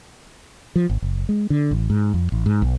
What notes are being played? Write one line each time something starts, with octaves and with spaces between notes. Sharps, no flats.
F3
G#1
F#1
G#3
D3
A1
G#2
F2
A1
G#2
B1